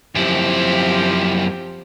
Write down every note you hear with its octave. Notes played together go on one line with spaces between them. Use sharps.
F#2 F3 C4 E4 G4